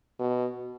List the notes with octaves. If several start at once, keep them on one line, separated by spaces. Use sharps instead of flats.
B2